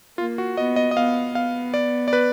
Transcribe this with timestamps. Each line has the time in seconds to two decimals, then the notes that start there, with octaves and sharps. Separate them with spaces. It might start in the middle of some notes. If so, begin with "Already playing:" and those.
0.18 A#3 F4
0.38 F#4
0.57 B3 D#5
0.76 D#5
0.91 D#5
0.96 B3 F5
1.35 B3 F5
1.74 D5
2.08 D5
2.13 B4